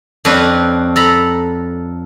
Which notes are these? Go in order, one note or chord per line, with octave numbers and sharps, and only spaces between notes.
F2 C4 D4 B4 C#5
A4 A#5 B5